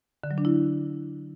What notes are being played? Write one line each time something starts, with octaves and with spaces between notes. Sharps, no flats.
D3
F#3
D4
E4